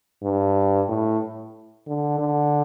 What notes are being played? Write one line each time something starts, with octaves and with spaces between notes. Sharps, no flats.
G2
A2
D3
D3